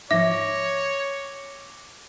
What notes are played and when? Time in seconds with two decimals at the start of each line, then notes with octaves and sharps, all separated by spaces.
0.11 G#2 F3 C#5 E5 D6 A#6